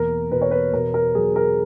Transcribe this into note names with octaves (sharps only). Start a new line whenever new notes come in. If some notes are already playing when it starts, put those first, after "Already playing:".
Already playing: E2 B2 A#3 A#4
B2 B4
C#5
B4
B2 A#4
A#4
F#3 G#4
A#4